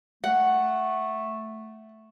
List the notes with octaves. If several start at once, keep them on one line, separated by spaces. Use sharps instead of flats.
A3 F#5